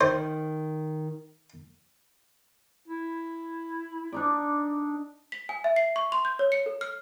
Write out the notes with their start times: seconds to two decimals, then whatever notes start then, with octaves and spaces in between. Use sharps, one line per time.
0.01 D#3 C5
2.88 E4
4.12 D4 D#4 D5
5.32 B6
5.49 G#5
5.64 E5
5.76 C7
5.96 C#6
6.12 C6
6.25 G6
6.39 C#5
6.52 C#7
6.66 A4
6.81 F6